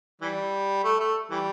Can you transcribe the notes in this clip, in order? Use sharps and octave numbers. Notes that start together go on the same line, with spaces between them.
E3 G3
A3
A3
E3 G3